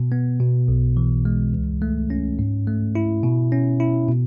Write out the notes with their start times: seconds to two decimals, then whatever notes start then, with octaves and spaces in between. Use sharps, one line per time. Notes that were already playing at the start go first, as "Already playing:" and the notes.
Already playing: B2
0.12 B3
0.40 B2
0.68 B1
0.97 E3
1.25 G#3
1.53 C#2
1.82 A3
2.10 C#4
2.39 G#2
2.67 A3
2.95 E4
3.23 B2
3.52 C#4
3.80 E4
4.08 B2